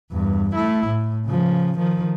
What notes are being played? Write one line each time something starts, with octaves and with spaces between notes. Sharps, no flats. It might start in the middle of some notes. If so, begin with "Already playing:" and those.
E2 G2
A3 E4
A2
C#3 F3
D#3 F3